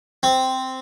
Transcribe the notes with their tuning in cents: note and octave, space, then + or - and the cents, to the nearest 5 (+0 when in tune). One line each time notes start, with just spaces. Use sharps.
C4 -5